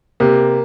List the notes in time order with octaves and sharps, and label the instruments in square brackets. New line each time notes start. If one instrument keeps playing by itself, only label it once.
[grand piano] C3 [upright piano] A#3